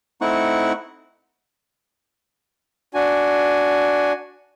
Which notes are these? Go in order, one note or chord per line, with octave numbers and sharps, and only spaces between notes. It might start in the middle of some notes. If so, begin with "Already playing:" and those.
A3 C4 D#4 E4 F#5 C#6
D4 F#4 G#5